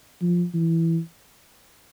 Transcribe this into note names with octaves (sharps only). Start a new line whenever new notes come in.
F3
E3